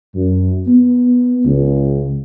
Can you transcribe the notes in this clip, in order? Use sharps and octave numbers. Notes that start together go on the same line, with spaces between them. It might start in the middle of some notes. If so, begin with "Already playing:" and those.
F#2
B3
C#2